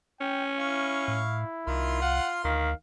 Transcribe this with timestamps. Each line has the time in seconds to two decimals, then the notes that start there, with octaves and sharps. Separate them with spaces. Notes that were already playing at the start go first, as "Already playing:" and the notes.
0.21 C#4 G5
0.58 E4 F5 C#6
1.08 A2
1.67 C2 D#3 F4 C6
2.02 F5 F#5
2.44 D2 D#3 F5